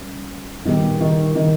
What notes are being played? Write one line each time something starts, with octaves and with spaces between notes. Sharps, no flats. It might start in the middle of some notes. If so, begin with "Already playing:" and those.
Already playing: G3 C#4
A#2 D#3 G3 B3 G4
D#3
D#3